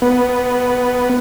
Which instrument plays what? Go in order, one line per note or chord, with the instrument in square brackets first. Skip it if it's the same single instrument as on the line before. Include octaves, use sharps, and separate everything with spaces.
[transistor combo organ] B3